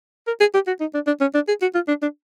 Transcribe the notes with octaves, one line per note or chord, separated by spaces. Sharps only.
A#4
G#4
G4
F#4
D#4
D4
D4
C#4
D4
G#4
F#4
F4
D4
D4